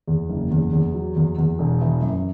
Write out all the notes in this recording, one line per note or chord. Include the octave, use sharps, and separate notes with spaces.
E2
F#1
E2
E2
F#3
E2
E2
E1
E3
F#2